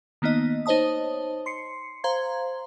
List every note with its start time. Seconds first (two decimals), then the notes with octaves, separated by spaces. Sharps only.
0.22 D#3 A#3 B3 D#4 D#5
0.66 D#4 C5 C#5 D#5 A5 D#6
1.46 C6 C7 C#7
2.04 C5 F5 A#5 C6 G#6